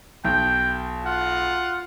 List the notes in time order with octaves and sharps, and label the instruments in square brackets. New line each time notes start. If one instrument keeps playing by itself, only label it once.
[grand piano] B1 [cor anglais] G5
[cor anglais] F4 [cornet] F#5